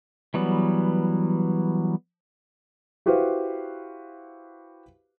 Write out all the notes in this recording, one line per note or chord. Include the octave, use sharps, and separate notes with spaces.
E3 F#3 G3 B3
E4 F#4 G4 B4 C5 F5